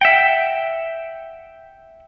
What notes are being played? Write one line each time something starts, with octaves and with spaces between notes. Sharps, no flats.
E5 F#5 G5